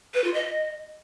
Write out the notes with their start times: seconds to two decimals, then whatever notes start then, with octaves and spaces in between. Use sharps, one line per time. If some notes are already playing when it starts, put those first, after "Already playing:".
0.14 B4
0.24 F4
0.34 D#5